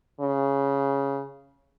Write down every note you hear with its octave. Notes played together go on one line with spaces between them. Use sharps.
C#3